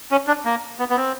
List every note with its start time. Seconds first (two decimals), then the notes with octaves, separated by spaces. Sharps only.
0.11 C#4
0.27 D4
0.45 A#3
0.79 B3
0.90 B3
0.97 C4